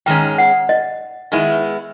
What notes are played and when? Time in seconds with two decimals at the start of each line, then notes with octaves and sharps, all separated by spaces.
0.06 G#2 D#3 G#3 C#4 G5
0.38 F#5
0.69 D#5
1.32 D#3 G#3 B3 E4